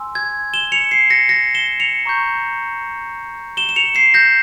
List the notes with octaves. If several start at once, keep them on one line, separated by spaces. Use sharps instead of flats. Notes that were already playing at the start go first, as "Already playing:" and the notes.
Already playing: G#5 C6 E6
G#6
E7 G7
C#7 F7
C7 E7
A#6 C#7
A#6 C#7
E7 G7
C#7 F7
A#5 C#6 G6
E7 G7
E7
C#7 F7
C7 E7
G6 A#6